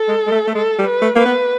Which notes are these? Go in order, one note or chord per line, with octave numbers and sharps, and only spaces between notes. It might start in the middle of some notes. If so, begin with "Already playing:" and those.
Already playing: A4
G#3
G#3
A3
A3
G#3 A4
G3
B4
A3
A#3 B4
B3